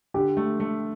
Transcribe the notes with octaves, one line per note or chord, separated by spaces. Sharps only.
D3 G4
A3
A3